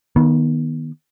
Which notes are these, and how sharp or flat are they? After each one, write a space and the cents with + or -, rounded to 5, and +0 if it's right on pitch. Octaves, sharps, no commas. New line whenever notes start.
D#3 +0 B3 -25